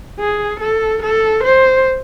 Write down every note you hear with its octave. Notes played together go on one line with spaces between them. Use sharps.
G#4
A4
A4
C5